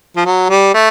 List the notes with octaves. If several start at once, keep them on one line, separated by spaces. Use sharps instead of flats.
F3
F#3
G3
A3